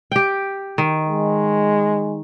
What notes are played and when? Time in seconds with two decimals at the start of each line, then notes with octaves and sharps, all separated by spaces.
0.12 G4 G5
0.78 D#3
1.08 G#3